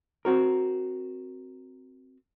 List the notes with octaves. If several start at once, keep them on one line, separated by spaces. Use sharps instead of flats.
C4 F#4 A#4